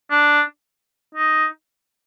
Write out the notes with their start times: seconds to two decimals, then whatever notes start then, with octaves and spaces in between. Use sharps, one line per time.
0.10 D4
1.15 D#4